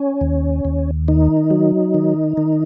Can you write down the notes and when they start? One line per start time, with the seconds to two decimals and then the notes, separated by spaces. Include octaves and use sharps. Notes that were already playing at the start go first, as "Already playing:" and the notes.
Already playing: C#4
0.21 D#2
0.65 D#2
1.08 D#3 D#4
1.50 F#3
1.94 D#3
2.37 D#3